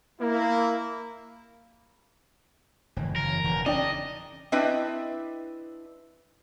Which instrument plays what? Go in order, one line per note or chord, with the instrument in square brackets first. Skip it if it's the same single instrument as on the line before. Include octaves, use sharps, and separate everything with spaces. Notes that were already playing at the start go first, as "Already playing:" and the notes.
[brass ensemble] A#3 E4
[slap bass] F#1 [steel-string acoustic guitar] A2 D#3 E3
[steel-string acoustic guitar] F#2 C#3 E3 [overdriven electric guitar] A#4
[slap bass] E1 [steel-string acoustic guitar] E3 F#3 A#5
[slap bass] C#3 [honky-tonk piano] D4 G5 [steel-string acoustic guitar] D#4 D5 [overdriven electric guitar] D#5
[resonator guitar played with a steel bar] C4 D4 E4 B4 D#5 E5